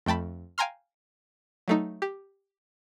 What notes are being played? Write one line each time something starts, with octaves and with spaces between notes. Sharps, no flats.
F2 A3 G5 A5 B5
F5 G5 G#5 A#5 C6 F6
F#3 A3 D#4
G4